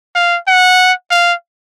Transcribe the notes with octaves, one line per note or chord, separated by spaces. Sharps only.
F5
F#5
F5